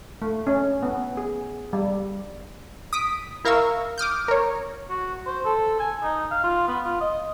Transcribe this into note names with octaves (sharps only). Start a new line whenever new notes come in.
A3
C#4
B3
G#4
G3
D#6 B6 D7
E4 A#4 F5 C#6 E6
D6 D#6 F6 G6
A#4 C#5
F#4
C5
A4
G#5
D#4
F5
F4
B3
F4
D#5